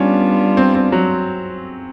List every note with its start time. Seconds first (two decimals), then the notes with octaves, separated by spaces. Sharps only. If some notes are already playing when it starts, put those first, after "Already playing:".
Already playing: G3 B3 C#4 D4 F4
0.57 C4
0.75 C4
0.92 F#3